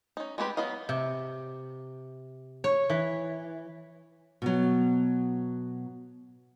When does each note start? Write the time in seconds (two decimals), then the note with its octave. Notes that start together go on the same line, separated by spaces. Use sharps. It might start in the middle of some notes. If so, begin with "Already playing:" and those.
0.17 C#4 D#4
0.38 G#3 B3 C4 G4 B4
0.57 F#3 B3 D#5 F5
0.89 C3
2.64 C#5
2.90 E3
4.42 B2 F#3